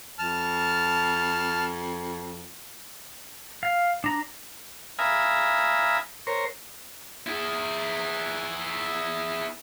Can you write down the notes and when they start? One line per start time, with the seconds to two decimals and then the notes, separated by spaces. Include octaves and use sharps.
0.18 F2 A5 F6
3.63 F5
4.04 D4 A#5
4.99 E5 F5 G#5 A#5 B5 D#6
6.27 A#4 C5 C#5
7.27 E4 G#4